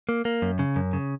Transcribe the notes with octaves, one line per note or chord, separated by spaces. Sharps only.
A#3
A#3
F#2
C#3
F#2
C#3